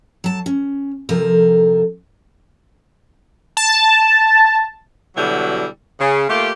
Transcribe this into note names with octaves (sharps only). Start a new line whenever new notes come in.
F#3 A5
C#4
F2 C3 F3 A4 A#4
A5
B2 D3 F#3 G3 E4
C#3
A3 A#3 F4 G4